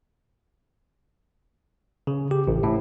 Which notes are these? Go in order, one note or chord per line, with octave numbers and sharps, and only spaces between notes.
C#3
G4
A1
A2